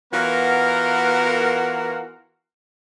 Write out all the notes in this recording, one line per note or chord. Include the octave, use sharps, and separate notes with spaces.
E3 B3 F4 F#4 A#4